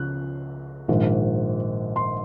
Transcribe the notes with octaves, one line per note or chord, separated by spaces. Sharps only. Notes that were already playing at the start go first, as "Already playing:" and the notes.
Already playing: C#2 C#3 F3 F#6
A#1 G#2 D#3
C6